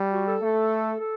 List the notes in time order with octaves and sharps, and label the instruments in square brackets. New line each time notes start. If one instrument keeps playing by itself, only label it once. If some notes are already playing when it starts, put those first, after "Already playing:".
Already playing: [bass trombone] G3
[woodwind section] F#4
A4
[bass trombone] A3
[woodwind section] A4